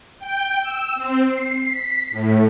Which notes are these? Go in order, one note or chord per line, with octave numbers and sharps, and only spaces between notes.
G5
E6
C4
C7
B6
A2